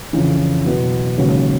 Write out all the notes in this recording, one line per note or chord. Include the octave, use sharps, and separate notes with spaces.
F2 C#3 E3
B2 F#3 B3 E4
E1 D#2 C#3 F#3